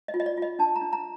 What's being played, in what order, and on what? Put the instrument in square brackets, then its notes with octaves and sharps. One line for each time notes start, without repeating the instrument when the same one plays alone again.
[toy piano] D#5
F4
D#5
D5
F4 D#5
D4 A5
A#5
D4
A#5